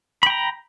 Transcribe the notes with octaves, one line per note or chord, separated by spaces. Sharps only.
G5 A#5 B5